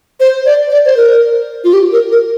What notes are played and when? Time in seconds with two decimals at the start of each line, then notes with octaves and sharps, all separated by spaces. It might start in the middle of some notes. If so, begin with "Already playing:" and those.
0.20 C5
0.46 D5
0.71 D5
0.85 C5
0.97 A#4
1.64 F4
1.73 G4
1.92 A#4
2.11 A#4